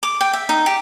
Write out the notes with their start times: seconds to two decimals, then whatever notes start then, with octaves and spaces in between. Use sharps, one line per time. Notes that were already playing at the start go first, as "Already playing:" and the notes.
0.03 D6
0.21 G5
0.33 E5
0.49 D#4
0.66 G4